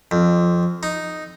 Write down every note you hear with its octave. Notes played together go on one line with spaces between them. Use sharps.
F2
D#4